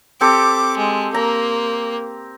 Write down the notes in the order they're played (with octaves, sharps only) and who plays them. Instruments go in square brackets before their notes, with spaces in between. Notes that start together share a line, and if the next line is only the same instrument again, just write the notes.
[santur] C4 G4 A4 [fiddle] D6
[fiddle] G#3
[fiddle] A#3 [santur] A#5